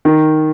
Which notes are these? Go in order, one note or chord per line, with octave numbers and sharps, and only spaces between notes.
D#3